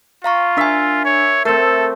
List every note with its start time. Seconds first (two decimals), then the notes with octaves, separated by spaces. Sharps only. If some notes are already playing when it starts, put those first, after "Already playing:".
0.24 F4 F5 A#5 C#6
0.57 D4 A#4 E5 G#5
1.05 C#5
1.45 A3 C4 A4 A#4